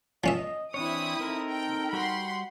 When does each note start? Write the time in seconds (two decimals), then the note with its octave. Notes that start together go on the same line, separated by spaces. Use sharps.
0.24 F3 C#4 D#5 E5
0.74 E3 C4 D4 E4 C#5 D#6
1.19 C4 D#4 A4 A#4
1.51 G5
1.93 G3 F#4 F#5 G5 B5 C6